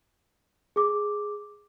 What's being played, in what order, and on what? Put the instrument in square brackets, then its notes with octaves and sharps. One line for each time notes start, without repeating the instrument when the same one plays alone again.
[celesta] G#4 D6